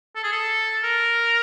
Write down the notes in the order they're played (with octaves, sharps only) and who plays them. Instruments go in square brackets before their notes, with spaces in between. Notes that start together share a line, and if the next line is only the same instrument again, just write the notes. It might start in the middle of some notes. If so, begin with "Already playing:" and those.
[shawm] A4
G#4
A4
A#4